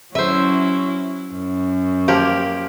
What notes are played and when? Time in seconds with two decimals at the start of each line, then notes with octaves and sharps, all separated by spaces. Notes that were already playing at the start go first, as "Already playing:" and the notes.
0.15 F#3 C#4 E4 C5 E5
1.34 F#2
2.08 F3 A#3 G4